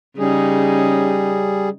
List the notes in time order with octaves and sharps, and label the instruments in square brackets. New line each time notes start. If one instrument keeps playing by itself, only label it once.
[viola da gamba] C#3 C#4 D#4 [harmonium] G3 G#4